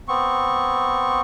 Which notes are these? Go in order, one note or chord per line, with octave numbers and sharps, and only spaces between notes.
B3 C4 C#6